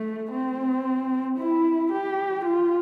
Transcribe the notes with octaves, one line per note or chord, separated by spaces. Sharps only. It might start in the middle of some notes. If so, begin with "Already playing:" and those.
Already playing: A3
C4
E4
G4
F4